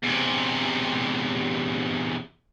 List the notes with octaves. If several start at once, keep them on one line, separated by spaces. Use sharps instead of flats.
E2 C3